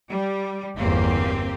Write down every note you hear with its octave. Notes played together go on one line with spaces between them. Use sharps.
G3
G1 E2 A#3 C4 G4